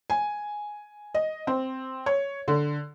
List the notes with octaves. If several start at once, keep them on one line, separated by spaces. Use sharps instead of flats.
G#5
D#5
C4
C#5
D3